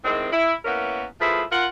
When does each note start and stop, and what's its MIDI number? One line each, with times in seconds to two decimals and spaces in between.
0.04 0.31 45
0.04 0.31 51
0.04 0.31 56
0.04 0.31 60
0.32 0.55 64
0.65 1.04 58
0.65 1.04 59
0.65 1.04 61
0.65 1.04 64
0.65 1.04 70
1.21 1.43 53
1.21 1.43 57
1.21 1.43 64
1.21 1.43 68
1.21 1.43 71
1.52 1.66 65
1.52 1.66 70
1.52 1.66 78